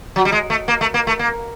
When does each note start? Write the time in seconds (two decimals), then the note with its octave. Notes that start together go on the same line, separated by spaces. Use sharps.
0.16 F#3
0.25 G3
0.32 G#3
0.50 A3
0.68 A#3
0.81 A3
0.94 A#3
1.07 A3
1.19 A#3